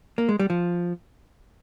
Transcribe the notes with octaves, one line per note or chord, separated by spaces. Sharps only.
A#3
G#3
G3
F3